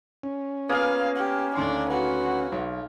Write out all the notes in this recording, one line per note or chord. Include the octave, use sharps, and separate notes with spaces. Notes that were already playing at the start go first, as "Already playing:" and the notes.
C#4
A#3 B3 F4 G#4 B4 F5
G4
D2 D#3 D4 C6
B3 F#4
B1